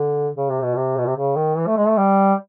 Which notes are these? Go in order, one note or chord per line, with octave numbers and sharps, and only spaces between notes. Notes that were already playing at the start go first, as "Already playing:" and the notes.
Already playing: D3
C#3
C3
B2
C3
B2
C3
C#3
D#3
E3
A3
G#3
A3
G3